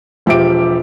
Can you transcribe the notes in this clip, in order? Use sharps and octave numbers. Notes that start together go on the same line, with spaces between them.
E1 F3 G4 E5 D6 D7